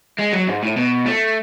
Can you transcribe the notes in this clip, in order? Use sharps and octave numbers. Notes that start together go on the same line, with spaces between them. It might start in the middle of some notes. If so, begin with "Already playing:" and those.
G#3
F#3
G#2
A2
B2
A3